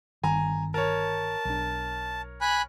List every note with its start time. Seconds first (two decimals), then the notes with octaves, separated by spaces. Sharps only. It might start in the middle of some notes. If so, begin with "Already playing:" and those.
0.24 G1 D#3 G#5 A#5
0.74 A#4 C#5 A5
1.45 B1 D4
2.41 G#5 B5 F#6